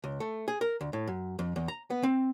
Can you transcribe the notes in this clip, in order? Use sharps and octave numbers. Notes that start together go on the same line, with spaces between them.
C#2
A3
G#4
A#4
D2
A2
F#2
F2
E2
A#5
B3
C4